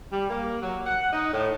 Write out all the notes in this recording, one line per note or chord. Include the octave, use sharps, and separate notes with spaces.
G3
A#3
F#3
F#5
D#4
A2